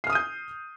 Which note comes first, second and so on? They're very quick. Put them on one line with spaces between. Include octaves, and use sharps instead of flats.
C7 F6 D#6 D#7 G6